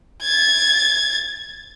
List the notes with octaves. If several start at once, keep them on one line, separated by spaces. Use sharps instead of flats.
G#6 A6